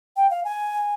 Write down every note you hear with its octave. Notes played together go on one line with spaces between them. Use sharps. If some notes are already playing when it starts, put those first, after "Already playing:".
G5
F5
G#5